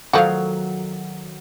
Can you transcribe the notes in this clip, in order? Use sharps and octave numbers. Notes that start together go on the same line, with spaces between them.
D#3 F3 F#3 F#4 A4 F5